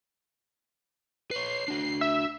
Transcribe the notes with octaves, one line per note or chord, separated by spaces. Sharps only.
B4 C#5 C7
D4 F#4
E5